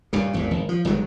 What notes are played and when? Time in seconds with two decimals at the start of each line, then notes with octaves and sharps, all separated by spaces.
0.13 G2 A#2 C#3
0.34 G#1 E2 A#2
0.51 G#1
0.69 F3
0.85 G1 D#3 F#3 G#3